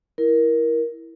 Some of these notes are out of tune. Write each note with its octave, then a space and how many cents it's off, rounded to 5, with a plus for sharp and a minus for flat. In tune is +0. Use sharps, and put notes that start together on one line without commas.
E4 +0 A#4 +15